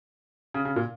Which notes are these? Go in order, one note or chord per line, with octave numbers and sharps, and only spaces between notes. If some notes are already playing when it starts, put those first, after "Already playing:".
C#3
C#3
A#2